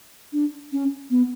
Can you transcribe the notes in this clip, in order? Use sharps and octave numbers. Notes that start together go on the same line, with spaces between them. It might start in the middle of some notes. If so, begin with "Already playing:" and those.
D4
C#4
B3